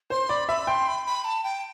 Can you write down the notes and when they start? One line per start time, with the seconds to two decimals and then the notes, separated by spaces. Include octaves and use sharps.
0.10 C5 C6
0.29 D5 B5
0.48 E5 B5
0.67 G5 C6
0.87 B5
1.06 B5
1.24 A5
1.43 G5